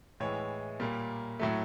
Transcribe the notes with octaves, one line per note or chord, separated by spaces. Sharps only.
A2 E3 G#3 C#5
A#2 G3 A#3
A2 F#3 A3